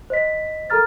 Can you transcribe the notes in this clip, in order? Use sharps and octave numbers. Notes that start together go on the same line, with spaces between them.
C5 D#5 B6
A4 A#4 A#5 F6 A6